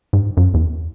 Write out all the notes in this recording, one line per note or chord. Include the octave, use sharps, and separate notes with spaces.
G#2
F#2
E2